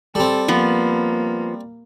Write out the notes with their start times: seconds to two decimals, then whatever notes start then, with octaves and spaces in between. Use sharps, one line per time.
0.15 G3 C4 A4
0.48 F3 A#3 B3